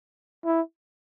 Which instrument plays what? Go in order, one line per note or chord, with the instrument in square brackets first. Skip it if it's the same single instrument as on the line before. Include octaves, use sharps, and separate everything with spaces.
[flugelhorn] E4